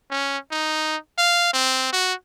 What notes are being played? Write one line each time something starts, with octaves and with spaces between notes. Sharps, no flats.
C#4
D#4
F5
C4
F#4